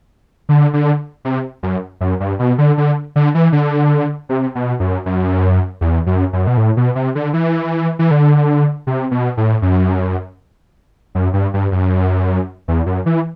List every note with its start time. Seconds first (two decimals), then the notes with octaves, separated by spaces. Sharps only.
0.49 D3
0.73 D3
1.25 C3
1.63 F#2
2.01 F#2
2.20 G2
2.39 B2
2.58 D3
2.78 D3
3.16 D3
3.35 E3
3.53 D3
4.29 C3
4.55 B2
4.80 F#2
5.06 F#2
5.81 E2
6.06 F#2
6.33 F#2
6.47 B2
6.57 A2
6.77 B2
6.95 C3
7.15 D3
7.33 E3
7.99 E3
8.11 D3
8.87 C3
9.11 B2
9.37 A2
9.62 F#2
11.15 F#2
11.33 G2
11.54 G2
11.72 F#2
12.68 E2
12.86 F#2
13.06 E3